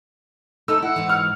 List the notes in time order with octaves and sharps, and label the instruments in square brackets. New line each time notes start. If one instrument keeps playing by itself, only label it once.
[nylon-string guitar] A3 D#4 A4 [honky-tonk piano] E6
[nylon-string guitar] E4 [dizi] F#5
[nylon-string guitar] G#2 E3
[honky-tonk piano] F6